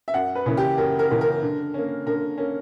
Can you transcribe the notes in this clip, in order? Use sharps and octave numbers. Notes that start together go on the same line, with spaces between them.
E5
F#2 F#5
B4
C#3 E3 A#3
G4
F#2 A#4
A#4
C#3 E3 A#3
A#4
D3
A#3 C#4
D3 A#4
A#3 C#4